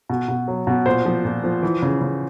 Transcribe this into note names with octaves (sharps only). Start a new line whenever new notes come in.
B2
B2
F#3
B2
A#2 C5
F3
A#2
F3
E3
C#3
C#3